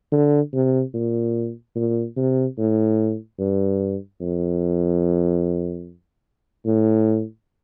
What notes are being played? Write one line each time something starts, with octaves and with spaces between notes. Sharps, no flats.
D3
C3
A#2
A#2
C3
A2
G2
F2
A2